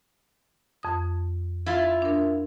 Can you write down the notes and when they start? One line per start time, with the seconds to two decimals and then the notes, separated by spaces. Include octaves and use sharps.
0.83 F2 D#6
1.66 E4 F4
2.02 D4 A#4